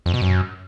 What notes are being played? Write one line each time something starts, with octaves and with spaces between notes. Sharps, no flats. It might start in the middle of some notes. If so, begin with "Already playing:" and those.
F2
B2
F#2